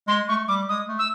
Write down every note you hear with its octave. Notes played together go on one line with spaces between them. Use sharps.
G#3 C6
A3 C#6
G3 D6
G#3 D#6
A3
E6